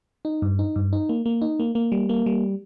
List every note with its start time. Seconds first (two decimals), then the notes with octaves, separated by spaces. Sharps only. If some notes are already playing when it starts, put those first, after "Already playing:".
0.25 D#4
0.42 G2
0.59 D#4
0.76 G2
0.93 D#4
1.09 A#3
1.26 A#3
1.42 D#4
1.59 A#3
1.75 A#3
1.92 G3
2.09 A#3
2.26 G3